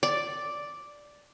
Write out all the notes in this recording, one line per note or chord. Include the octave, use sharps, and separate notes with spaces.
D5